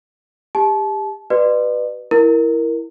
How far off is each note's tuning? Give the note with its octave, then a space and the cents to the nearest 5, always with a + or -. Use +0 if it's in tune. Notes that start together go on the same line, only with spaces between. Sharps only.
G4 +25 A5 -30
F#4 +45 B4 +0 D5 +40
E4 +0 A#4 +0